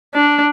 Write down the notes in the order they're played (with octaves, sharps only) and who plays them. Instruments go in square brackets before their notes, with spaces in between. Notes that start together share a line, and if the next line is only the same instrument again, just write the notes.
[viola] D4